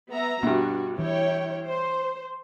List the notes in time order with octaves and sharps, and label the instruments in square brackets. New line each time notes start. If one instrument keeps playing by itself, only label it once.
[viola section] B3 E5 A#5
[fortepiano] G2 B2 [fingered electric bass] D4 [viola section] F#4
[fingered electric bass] E3 [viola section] E4 C#5 G5
[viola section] C5